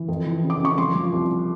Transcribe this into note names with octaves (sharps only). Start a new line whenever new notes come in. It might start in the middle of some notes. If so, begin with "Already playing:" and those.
Already playing: E3
F2
E3
C#3
D6
C#3 C#6
F3 C6
F3
C2